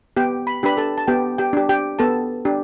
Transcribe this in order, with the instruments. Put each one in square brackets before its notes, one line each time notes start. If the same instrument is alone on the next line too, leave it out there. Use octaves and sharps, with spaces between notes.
[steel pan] B3 G4 G5
B5
D4 G4 B4 B5
A4 A5
A5
B3 G4 G5
G4 G5
D4 G4
G4 G5
B3 A4 A5
D4 G4